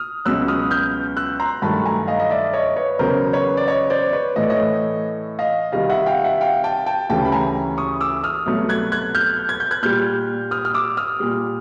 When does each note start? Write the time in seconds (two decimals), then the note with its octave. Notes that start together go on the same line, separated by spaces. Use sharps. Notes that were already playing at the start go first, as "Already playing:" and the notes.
Already playing: D#6 F6
0.25 C#2 B2 F#3 E6 F#6
0.48 D#6 F6
0.71 F6 G6
1.17 E6 F#6
1.40 A#5 C6
1.62 G2 D#3 F#3 A3 A5 B5
1.85 G#5 A#5
2.07 D#5 F5
2.20 D#5
2.30 D5 E5
2.53 C#5 D#5
2.76 B4 C#5
2.99 E2 C#3 F#3 A#4 C5
3.33 B4 C#5
3.57 D5
3.67 C#5 D#5
3.90 C5 D5
4.13 B4 C#5
4.36 A2 E3 A3 D#5
4.43 D5
4.50 C#5 D#5
5.39 D#5 F5
5.72 C2 C3 D#3 G3 D#5 F5
5.90 E5 F#5
6.06 F5 G5
6.24 E5 F#5
6.41 F5 G5
6.64 G5 A5
6.86 G5 A5
7.09 D2 C#3 E3 G3 G5 A5
7.25 B5
7.32 G#5 A#5
7.78 C#6 D#6
8.01 D6 E6
8.24 D#6 F6
8.46 C2 B2 F#3 A3
8.69 F#6 G#6
8.92 F#6 G#6
9.15 F6 G6
9.49 G#6
9.60 G6
9.71 F#6 G#6
9.83 A#2 G3 F6 G6
10.51 D#6 F6
10.65 F6
10.74 D6 E6
10.97 D#6 F6
11.20 A#2 G3